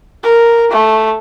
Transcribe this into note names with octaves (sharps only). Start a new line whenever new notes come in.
A#4
A3